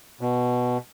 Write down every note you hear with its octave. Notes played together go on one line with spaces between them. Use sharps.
B2